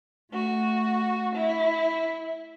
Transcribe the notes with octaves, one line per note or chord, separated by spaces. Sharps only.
A3 F#4
E4